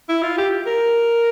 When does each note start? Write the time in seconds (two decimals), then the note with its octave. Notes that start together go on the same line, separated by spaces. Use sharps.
0.09 E4
0.23 F4
0.38 G4
0.67 A#4